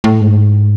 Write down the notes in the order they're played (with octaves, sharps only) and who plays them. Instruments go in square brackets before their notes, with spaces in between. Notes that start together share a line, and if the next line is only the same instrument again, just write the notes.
[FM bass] A2
G#2